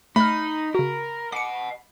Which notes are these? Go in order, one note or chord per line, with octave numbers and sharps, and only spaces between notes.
A3 D#4 B5 F6
C#3 F#4 A#4
D#5 F#5 D6 C#7